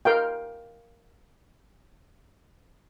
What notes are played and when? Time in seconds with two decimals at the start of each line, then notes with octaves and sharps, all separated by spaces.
0.05 A#4 F5 G5